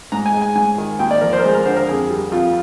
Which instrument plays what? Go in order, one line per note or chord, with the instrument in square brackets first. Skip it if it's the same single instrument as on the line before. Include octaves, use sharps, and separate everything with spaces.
[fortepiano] G#2 A#5
G#5
G#3
G#5
G#2 G#5
D#3
D#2 G5
D5
F3 A#4
C5
A#4
G#3 C5
A#4
D3 C5
A#4
F2 G#4
G3
F2 F4